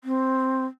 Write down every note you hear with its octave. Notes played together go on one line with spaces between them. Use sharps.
C4